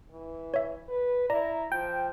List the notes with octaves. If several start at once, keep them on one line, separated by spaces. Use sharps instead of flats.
E3
C#5 E5
B4
E4 D5 A#5
F3 G5